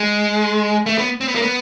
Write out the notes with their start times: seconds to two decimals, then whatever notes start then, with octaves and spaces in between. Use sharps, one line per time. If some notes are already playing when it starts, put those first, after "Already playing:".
Already playing: G#3
0.86 A3
0.98 B3
1.21 C4
1.28 B3
1.35 A#3
1.42 B3